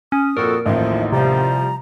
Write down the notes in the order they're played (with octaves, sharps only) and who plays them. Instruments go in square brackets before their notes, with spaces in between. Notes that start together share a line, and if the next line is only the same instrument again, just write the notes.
[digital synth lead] C#4 [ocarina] D#6
[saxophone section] F2 F#4 A4 [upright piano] A#2 [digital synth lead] A#4
[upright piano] A1 D#2 A2 [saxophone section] F3 D#4 [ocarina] E5
[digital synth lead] C3 [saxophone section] F3 G3 [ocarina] A#5